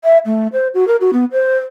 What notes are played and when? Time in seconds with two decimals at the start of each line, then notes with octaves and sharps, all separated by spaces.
0.04 E5
0.26 A3
0.53 C5
0.74 F#4
0.88 A#4
1.01 F#4
1.13 B3
1.32 C5